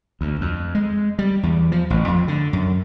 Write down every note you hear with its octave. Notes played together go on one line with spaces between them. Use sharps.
D2
F2
G#3
G3
E2
F3
A1
F2
D3
F#2